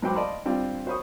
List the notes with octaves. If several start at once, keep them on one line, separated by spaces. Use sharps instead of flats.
G#2 F#3 C5 G5 B5 D6
D5 D#5 F5 A5 B5 C6
G3 C4 D4 F4
F#4 C5 C#5 B5 C#6 D#6